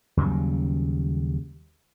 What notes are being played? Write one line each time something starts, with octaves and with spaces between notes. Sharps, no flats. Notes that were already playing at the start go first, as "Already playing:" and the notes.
D#2 C#3 F#3 G3